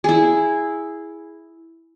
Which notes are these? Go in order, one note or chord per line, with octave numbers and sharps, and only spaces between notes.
E4 G#4